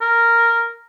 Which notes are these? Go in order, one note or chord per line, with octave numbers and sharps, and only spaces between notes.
A#4